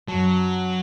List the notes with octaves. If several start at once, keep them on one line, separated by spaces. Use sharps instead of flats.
F#2 F#3 A5